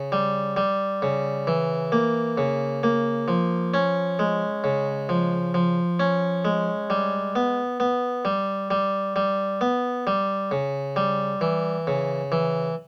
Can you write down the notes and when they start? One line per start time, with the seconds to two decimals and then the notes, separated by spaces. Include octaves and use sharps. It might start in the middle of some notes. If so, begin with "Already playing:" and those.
Already playing: C#3
0.12 G3
0.56 G3
1.02 C#3
1.47 E3
1.92 A#3
2.38 C#3
2.83 A#3
3.28 F3
3.74 C#4
4.19 G#3
4.64 C#3
5.09 F3
5.54 F3
6.00 C#4
6.45 G#3
6.90 G3
7.36 B3
7.80 B3
8.25 G3
8.71 G3
9.16 G3
9.61 B3
10.07 G3
10.51 C#3
10.96 G3
11.41 E3
11.87 C#3
12.32 E3